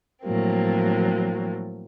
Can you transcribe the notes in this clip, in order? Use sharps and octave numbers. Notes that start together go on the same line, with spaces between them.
A2 F3 F#3 A#3 C4